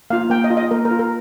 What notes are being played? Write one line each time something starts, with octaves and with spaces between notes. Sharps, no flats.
A#3 F4 F5
A#3 G5
D#5
F4
D#5
A#3 A#4
A#4
F4
A#4